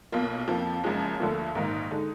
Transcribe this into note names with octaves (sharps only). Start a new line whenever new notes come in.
B1 B2 A#3 F4
F2 F3 A#3
F#1 F#2 F3 G#3
D2 D3 F3 A#3
A#1 G#2 D#3 A#3 D#4
D3 G#3 D#4